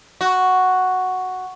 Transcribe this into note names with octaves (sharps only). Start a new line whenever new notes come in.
F#4